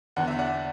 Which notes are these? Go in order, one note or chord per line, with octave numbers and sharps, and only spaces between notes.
E2 D3 F#5
E5
D5 F#5